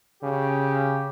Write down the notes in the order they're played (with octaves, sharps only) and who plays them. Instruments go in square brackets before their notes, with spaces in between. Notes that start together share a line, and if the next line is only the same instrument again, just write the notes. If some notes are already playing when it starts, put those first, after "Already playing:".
[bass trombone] C#3 [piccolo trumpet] G4